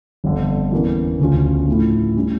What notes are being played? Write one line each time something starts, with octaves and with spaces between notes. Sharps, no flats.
G1 F2 D3
E2 E3 A#3 C#4
D2 C#3 F3 C#4 F4
A2 F3 A3
A2 G3 C#4